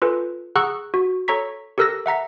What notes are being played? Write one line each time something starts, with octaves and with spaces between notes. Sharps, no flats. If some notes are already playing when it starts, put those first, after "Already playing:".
F4 A4 B4 G#5
G#4 F#5 A#5 C#6 E6 F#6
F#4
A4 C#5 A#5 C#6 B6
G4 A4 A#4 E6 F#6 A#6
E5 F#5 A#5 B6